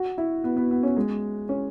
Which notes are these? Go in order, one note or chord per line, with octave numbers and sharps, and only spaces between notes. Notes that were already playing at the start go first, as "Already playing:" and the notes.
Already playing: F#4
E4
B3
B3
B3
C#4
G#3
C#4